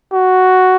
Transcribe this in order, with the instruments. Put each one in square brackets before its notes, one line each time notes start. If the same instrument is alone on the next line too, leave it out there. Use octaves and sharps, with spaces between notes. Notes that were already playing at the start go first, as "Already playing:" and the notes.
[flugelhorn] F#4